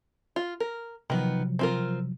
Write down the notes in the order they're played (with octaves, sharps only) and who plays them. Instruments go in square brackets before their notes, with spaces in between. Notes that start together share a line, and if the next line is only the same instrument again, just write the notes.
[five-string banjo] F4
A#4
[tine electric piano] C3 F3 F#3 [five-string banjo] D#3 B3
[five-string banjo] C4 F4 A#4